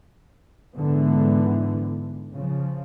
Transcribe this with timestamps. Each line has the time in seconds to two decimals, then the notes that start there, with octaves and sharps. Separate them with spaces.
0.75 G#2 D3 E3 B3
2.34 C#3 F3